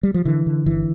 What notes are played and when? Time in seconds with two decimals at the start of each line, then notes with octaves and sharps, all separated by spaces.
0.03 G3
0.14 F3
0.25 D3 E3
0.46 D3
0.66 G1 E3